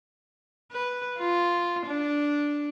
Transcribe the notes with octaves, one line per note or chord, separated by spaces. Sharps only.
B4
F4
D4